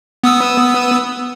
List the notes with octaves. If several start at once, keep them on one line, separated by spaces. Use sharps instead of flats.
B3 D#6 E6